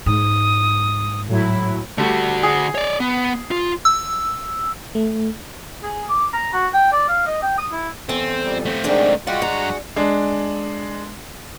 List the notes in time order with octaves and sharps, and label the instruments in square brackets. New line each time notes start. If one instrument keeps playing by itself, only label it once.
[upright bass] G#2 [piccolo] D#6
[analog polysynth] A2 F#3 E4
[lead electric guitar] D3 F#4 [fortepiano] G3 A3
[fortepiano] G#4
[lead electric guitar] C#5 D5
B3
F4
[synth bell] E6
[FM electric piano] A3
[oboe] G#4
D6
A#5
F#4
G5
D5
F5
D#5
G5
D#6
E4
[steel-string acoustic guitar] E2 A4 G#5 [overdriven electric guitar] C4
[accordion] F2 G3
[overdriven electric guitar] A3 C4
[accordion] G#2 D#3 [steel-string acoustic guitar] D4 G#4 D5
[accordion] G#3 F#4 F#5 [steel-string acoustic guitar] F4 [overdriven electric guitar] D5 G5
[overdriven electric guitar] G2 A#5 [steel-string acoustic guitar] D4
[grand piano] G#3 D4